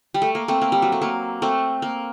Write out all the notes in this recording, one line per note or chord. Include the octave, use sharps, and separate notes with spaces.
G3
A3
A#3
A3 C4
A#3
G3
F#3
A3
A#3
A3 C4
A#3